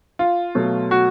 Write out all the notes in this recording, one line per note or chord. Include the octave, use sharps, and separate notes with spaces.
F4
B2 F#3 A3
F#4